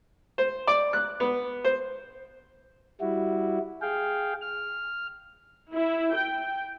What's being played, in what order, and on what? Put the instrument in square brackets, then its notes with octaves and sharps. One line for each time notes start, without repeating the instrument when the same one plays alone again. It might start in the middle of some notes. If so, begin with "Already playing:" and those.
[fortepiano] C5
D5
F#6
B3
C5
[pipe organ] G3 E4 F#4
G#4 F5 G5
F6
[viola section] E4
G5